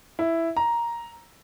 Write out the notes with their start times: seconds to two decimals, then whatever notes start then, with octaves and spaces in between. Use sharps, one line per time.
0.19 E4
0.57 A#5